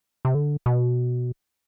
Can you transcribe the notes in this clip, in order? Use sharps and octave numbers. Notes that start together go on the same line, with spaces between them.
C3
D3
B2